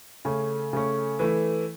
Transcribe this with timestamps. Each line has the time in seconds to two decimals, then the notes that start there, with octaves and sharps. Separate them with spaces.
0.25 C#3 A3 C#4
0.73 C#3 A3 C#4
1.19 E3 A3 E4